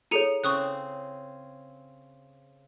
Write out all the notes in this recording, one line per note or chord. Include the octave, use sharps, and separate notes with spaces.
E4 G#4 A4 C#5 C#7 D#7
C#3 C4 C#6 D#6 F#6